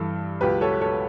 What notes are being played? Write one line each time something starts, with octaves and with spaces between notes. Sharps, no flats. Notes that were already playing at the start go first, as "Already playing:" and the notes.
Already playing: G2 E3 A4
C#2 B2 F#3 G4 B4
A4 C#5
A4 C#5